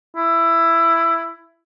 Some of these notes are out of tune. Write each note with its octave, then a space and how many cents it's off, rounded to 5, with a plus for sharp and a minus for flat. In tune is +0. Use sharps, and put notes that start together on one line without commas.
E4 +15